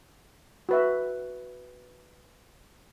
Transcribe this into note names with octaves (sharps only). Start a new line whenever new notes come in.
F#4 B4 E5